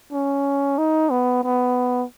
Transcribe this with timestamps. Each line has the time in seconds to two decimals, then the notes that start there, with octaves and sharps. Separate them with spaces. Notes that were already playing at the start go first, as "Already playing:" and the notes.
0.12 C#4
0.78 D#4
1.11 B3
1.44 B3